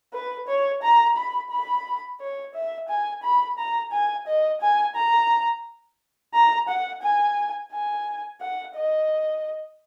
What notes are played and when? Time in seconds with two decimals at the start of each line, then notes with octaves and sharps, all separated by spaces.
0.13 B4
0.48 C#5
0.83 A#5
1.17 B5
1.51 B5
2.20 C#5
2.55 E5
2.89 G#5
3.23 B5
3.58 A#5
3.92 G#5
4.27 D#5
4.61 G#5
4.96 A#5
6.34 A#5
6.69 F#5
7.03 G#5
7.72 G#5
8.41 F#5
8.76 D#5